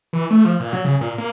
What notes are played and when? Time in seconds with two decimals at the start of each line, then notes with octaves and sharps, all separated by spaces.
0.13 E3
0.30 A3
0.45 F3
0.60 A#2
0.73 F#3
0.85 C#3
1.01 A#2
1.18 A#3